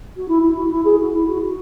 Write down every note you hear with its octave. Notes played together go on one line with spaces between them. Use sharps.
F#4
E4
E4
F#4
E4
G#4
F#4
E4
F#4
F#4